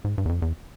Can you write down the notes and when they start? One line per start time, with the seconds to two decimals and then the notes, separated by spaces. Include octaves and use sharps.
0.04 G#2
0.18 G2
0.25 E2
0.29 F2
0.42 E2